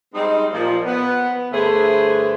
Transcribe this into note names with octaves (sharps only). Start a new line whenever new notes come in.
G3 G#3 C4 D#4
A#2 F3
B3
G2 D3 A3 G#4 B4 C5